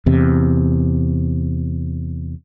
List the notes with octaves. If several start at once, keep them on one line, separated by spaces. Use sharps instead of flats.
E2 C3